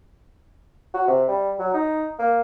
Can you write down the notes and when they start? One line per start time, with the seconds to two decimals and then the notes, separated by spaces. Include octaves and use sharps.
0.94 F#4
1.07 C3
1.28 G3
1.59 F#3
1.73 D#4
2.19 A#3